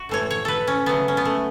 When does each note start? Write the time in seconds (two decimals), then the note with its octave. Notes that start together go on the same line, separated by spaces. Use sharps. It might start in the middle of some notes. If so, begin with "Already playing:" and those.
Already playing: F#4
0.09 A2 E3 A3 C#5
0.31 C#5
0.45 A4 B4
0.67 C#4
0.86 C#3 F#3 A3 B3
1.08 C#4
1.17 B3
1.25 A3